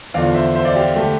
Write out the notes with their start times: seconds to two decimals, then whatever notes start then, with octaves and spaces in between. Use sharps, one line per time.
0.14 E2 D3 F3 D5 F5
0.35 C5 E5
0.55 C5 E5
0.65 D5 F5
0.76 G4
0.96 D3 A3 G4